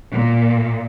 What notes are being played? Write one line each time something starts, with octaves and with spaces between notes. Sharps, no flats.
A#2